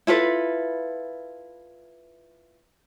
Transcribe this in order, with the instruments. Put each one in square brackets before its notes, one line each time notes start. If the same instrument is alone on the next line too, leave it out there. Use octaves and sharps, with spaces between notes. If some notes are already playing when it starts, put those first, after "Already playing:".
[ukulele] E4 F4 A4 B4